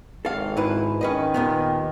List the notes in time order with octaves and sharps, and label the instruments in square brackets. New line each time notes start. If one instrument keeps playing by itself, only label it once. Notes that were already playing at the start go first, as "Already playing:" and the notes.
[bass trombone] G#1 [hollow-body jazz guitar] A4 F5
[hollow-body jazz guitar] G#2 E4 B4
[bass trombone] D#3 [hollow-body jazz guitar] C#4 B4 D#5
[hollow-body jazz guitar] D#2 A#2 B3